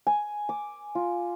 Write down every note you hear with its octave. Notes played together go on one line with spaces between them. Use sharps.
G#5
D6
F4